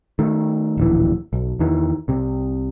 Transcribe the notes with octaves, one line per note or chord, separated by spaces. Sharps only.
D#3 A3
D1 A#1 E3
B1
E2 D#3 E3
C2 C3